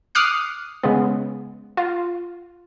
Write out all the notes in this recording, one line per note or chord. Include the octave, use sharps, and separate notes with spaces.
D6 D#6 F6 F#6 C7 C#7
C#3 G#3 B3
F4